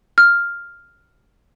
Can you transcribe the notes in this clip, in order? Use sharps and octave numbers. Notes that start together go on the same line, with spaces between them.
F6